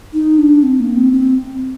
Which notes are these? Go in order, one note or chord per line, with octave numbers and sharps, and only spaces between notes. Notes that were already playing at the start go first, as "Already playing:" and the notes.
D#4
D4
C4
A#3
C4
C4